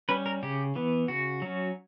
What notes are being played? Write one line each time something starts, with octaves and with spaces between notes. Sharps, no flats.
G3 C#4 B4
A#4
C#3 G4
E3 B3
C#3 F#4
F#3 C#4